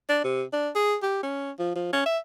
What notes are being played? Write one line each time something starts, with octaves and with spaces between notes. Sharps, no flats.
D4
C3
D4
G#4
G4
C#4
F3
F3
C#4
E5